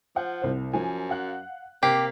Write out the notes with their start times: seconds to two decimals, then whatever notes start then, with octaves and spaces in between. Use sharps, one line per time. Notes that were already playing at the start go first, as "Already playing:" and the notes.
0.16 F3 F#5
0.42 C2 C5
0.73 F#2 F3 G#5
1.09 F5 F#5 F#6
1.83 C3 A#3 G4 B6 C7